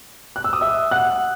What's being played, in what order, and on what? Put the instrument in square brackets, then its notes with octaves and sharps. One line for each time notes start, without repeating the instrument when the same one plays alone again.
[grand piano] F#6
E6
D#6
E5 E6
F#5 F#6